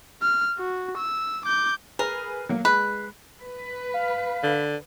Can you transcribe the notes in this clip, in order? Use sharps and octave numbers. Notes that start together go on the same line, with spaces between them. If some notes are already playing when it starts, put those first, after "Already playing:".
F6
F#4
E6
D6 G6
G#4 A#4 B4
F#3 A#3
G#3 B4
B4
F5
D3